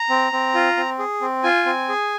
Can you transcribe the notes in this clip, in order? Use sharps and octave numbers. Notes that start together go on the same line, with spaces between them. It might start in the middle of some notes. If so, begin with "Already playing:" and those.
Already playing: A#5
C4
C4
F4
C4
G#4
C4
F4 G#5
C4
G#4